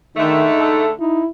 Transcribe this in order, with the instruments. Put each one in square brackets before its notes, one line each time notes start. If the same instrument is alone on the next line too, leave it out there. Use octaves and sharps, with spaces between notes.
[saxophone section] D3 G#3 A3 [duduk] D#3 [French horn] D#4
[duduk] A4
[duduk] D#4 [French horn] E4